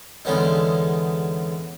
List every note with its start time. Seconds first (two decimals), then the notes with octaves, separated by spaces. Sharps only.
0.25 E2 D3 G#3 B3 C#4 D#4